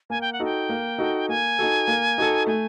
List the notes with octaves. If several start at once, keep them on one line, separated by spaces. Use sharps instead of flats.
A#3 G#5
G5
F#5
D#4 F#4 A4 G5
A#3
D#4 F#4 A4
A#3 G#5
D#4 F#4 A4
A#3
D#4 F#4 A4
A3 G#5